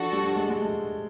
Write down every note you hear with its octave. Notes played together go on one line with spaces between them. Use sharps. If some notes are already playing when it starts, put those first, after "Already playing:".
Already playing: F3 D4 F#4 A4
G3
G#3
G#3
A3